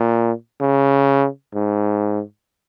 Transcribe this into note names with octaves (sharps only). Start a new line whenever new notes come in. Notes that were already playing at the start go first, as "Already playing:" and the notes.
Already playing: A#2
C#3
G#2